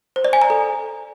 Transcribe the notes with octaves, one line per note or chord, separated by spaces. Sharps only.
C5
D5
G#5
A#5
A4